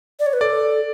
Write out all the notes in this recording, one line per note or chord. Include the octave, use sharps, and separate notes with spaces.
D5
C#5
B4
A4 D5